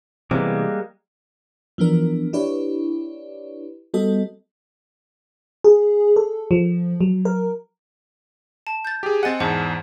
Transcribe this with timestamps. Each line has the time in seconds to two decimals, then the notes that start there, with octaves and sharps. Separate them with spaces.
0.31 C3 E3 G3 G#3 A#3 B3
1.78 E3 F3 B3 D4 A#4
2.33 D4 E4 G4 B4 C#5 D5
3.94 G3 B3 F#4 A4 D#5
5.64 G#4
6.16 A4
6.51 F3
7.01 F#3
7.25 A#4
8.67 A5
8.85 G6 A6
9.03 G4 G#4
9.23 C4 D#5 F#5 G#5 A6
9.40 E2 G#2 C5 F#5 A5